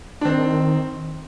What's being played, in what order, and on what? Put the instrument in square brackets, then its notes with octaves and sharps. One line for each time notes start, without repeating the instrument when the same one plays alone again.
[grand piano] D4
[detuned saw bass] D#3 [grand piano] C4